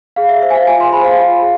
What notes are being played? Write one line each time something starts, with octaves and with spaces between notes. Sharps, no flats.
G#4 F5
E5
C5 E5
G#5
F5
F4 G#5
C6
G#4 C5 B5
F5
F4
G#4